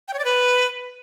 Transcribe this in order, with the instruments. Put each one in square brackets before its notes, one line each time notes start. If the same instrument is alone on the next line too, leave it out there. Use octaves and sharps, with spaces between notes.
[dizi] G5
C#5
D5
B4